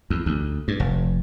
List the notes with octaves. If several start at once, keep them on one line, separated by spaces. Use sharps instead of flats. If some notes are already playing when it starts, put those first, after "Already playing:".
E2
D2
G2
F1